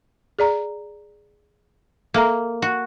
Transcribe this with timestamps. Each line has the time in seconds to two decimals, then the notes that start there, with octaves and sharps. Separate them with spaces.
0.39 G#4 D5 A#5
2.14 A#3 A4 E5 A#5
2.62 F#4